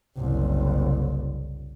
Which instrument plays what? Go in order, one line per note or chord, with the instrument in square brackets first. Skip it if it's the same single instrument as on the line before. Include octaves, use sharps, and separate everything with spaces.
[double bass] F#1 C2